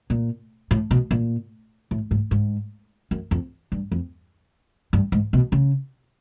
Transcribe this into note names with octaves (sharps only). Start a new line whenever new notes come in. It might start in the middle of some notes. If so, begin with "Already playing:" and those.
A#2
A2
B2
A#2
A2
G#2
G#2
F#2
F2
G2
F2
G2
G#2
B2
C#3